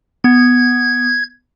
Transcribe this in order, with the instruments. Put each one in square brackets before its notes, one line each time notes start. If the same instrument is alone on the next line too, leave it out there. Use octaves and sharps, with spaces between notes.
[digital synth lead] B3 [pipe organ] G#6